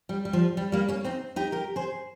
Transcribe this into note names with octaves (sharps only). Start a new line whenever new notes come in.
G3
G3
F3
G3
G3 A#3
A#3 C#4
C4 D#4
D#4 G4
G4 A#4
G#4 C5